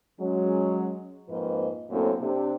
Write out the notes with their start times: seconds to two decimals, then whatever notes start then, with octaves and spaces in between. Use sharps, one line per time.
0.20 F#3 G#3 C#4
1.29 F2 G#2 F3 A#3 B4 D#5
1.91 F#2 A2 A#3 C4 D4 A4
2.21 C3 D4